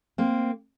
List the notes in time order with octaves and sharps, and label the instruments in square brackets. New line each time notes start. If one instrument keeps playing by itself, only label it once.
[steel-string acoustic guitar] A#3 C4